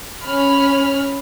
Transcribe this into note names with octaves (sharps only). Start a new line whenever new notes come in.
C#4 B5 F6